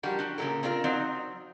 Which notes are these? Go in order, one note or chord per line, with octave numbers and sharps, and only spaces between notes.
F3 G3 D4 F#4 A#4
D4 F#4 G4
A#2 C#3 E3 F#3 A4 A#4
C4 D4 F4 G4 A#4
F#3 C4 D#4 D5 F5